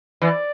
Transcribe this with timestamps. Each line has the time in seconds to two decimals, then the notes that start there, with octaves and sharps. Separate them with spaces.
0.22 E3 D5